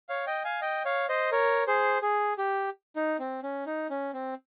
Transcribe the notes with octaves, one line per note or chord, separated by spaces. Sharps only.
C#5 F5
D#5 G5
F5 G#5
D#5 G5
C#5 F5
C5 D#5
A#4 C#5
G#4 C5
G#4
G4
D#4
C4
C#4
D#4
C#4
C4